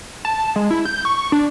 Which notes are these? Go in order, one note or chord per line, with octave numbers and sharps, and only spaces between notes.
A5
G#3
E4
G6
C#6
C#6
D4